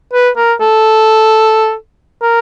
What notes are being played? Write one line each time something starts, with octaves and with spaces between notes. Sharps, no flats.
B4
A#4
A4
A#4